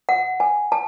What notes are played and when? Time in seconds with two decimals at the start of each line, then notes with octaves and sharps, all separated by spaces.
0.09 F#5
0.40 G#5
0.72 A5